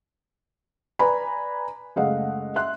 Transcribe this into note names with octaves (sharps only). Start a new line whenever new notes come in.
B4 D5 G#5 A#5 B5
F#1 G#3 A3 D#5 F5 F#5
E5 C6 F#6